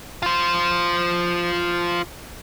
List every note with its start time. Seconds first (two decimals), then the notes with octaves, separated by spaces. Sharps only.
0.22 F4 C5